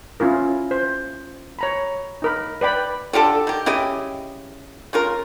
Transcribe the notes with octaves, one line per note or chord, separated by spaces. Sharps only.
C#4 E4 F4 A#4
C5
C#5 A#5 B5
D#4 A#4 B5
B4 D5 G5 B5
D3 F4 G4 A4
D#3 G4
C#3 E4 G4 D#5
C#3 F4 A#4